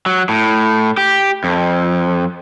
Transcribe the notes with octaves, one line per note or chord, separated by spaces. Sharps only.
F#3
A2
G4
F2